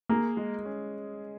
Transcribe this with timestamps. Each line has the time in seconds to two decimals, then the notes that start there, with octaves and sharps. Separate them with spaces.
0.09 A#3 G#4
0.37 G#3
0.65 C#4